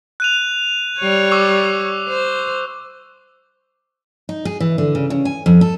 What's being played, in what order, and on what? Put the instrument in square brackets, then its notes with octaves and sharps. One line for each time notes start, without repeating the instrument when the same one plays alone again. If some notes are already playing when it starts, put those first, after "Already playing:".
[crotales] F#6 D#7 F7
[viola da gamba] G3 C#5
[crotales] C#6 D6 E6
[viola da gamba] C5
[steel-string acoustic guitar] D#4
G#4
E3
D3
C#3
C#3
G#5
F2
A4